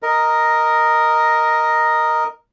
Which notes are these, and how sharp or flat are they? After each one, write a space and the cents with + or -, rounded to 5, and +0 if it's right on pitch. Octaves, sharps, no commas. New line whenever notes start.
A#4 +0 D#5 +0